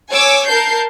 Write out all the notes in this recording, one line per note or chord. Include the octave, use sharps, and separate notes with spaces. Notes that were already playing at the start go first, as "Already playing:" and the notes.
C#5 G#5 D6 E6
A#4 A5 G6 C7